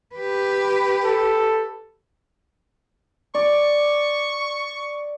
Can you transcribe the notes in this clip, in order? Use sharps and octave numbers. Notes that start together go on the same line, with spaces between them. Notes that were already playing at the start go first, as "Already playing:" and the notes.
G4 B4
A4
D5 C#6